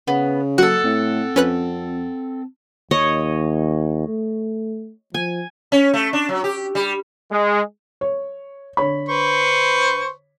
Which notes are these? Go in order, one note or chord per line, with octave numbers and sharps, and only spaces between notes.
C#3 B3
F#3 A3 A#3 F#4 A4 F#5
A2 C4
F2 C#4 B4 F#6
D#2 C#5 D#5
A3
F3 G#5
C#4
A3
D4
F#3
G4
G3
G#3
C#5
D3 C#5 B5
B4 C5 C#6